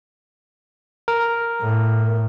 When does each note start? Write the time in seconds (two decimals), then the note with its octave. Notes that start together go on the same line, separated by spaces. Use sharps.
1.08 A#4
1.61 A2